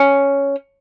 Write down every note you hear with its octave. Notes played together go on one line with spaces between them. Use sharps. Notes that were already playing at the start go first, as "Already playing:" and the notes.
Already playing: C#4